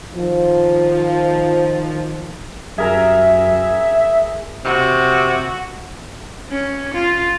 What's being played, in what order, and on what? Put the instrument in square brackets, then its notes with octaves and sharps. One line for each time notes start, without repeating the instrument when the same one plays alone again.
[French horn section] D#3 F3
[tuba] F#2 [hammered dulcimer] G#4 A#4 A#5 [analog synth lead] E5
[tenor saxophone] C3 [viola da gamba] F#4
[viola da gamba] C#4
F4